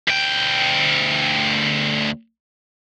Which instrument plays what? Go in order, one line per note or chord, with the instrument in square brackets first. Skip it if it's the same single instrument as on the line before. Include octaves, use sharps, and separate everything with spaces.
[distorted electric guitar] D2 G5